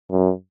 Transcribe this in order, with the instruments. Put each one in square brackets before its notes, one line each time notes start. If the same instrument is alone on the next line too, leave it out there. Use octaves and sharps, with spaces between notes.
[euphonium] F#2